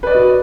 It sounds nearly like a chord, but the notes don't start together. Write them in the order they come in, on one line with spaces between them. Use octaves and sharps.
B4 D5 D#5 F#4